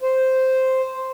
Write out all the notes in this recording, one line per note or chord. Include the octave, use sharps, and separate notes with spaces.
C5